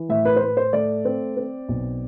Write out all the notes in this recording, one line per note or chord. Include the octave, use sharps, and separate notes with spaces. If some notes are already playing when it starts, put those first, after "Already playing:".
Already playing: E3
A2 E5
B4
C5
A2 B4
C5
A3 D5
C4
C4
B1